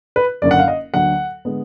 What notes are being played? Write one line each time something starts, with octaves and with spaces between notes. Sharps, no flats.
B4
F#1 F#2 D3 D5
F#5
F5
D#5
D2 D3 F#3 A#3 F#5
D3 G#3 B3